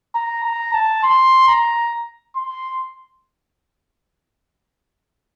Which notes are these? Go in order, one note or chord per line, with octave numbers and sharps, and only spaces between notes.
A#5
A#5
A5
C6
A#5
C6